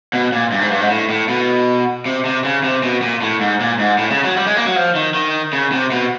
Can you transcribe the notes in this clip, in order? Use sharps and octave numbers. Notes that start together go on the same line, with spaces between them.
B2
A#2
G2
G#2
G2
G#2
A2
A2
B2
C3
C3
C#3
C3
B2
A#2
A2
G#2
A#2
G#2
A2
C#3
F#3
G3
G#3
A#3
F#3
F3
D#3
D#3
C#3
C3
B2